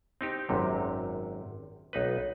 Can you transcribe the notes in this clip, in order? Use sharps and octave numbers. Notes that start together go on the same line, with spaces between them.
C4 D#4 G4
G#1 F#2 C3
B1 D#4 B4